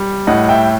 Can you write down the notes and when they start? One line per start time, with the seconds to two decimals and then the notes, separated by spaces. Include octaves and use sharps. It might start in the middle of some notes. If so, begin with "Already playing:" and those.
Already playing: G3
0.27 A2 D#5 F#5
0.49 E5 G5